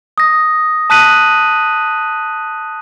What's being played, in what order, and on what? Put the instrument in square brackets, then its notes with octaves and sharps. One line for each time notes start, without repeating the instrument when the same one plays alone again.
[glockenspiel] D#6 A#6
A5 D#6 F#6 B6 D#7 F#7